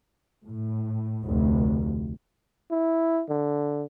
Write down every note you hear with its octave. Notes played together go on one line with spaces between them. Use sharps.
A2
F1 D2
E4
D3